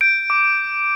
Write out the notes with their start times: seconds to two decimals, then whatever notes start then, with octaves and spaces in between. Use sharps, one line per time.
0.01 G6 D7
0.30 D6